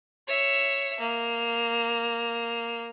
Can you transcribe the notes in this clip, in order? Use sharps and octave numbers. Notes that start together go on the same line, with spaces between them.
C#5 E5
A#3